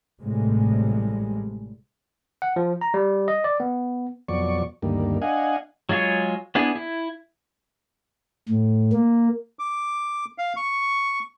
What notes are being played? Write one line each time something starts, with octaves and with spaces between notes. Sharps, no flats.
A1 A2 C3 G3 G#3
F#5
F3
A#5
G3
D#5
D5
B3
F2 B2 F#3 D5 C#6
D2 G2 D#3 G3 A#3
D4 D#5 F5 F#5 G#5
F#3 G#3 F4 G#4 C#5
B3 D4 E4 G#4
E4
A2
A#3
D6
F5
C#6